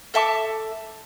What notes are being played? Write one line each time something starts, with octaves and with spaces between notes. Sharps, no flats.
A4 E5 A5 D6